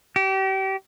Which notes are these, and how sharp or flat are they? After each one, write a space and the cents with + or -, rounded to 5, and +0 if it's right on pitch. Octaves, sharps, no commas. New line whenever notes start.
G4 -30